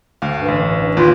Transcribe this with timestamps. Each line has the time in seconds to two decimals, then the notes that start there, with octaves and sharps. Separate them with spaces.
0.22 D2 F5
0.36 G2
0.48 A1
0.97 D#2 F4 B4